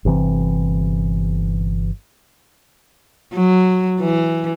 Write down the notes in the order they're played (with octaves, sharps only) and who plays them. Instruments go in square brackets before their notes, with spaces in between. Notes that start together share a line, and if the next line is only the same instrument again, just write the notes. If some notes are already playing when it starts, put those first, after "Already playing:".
[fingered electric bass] G1 C3 E3 C4
[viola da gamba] F#3
E3